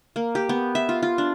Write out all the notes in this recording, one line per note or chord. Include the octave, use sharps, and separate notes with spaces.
A#3
G4
B3
E5
F4
F4
D4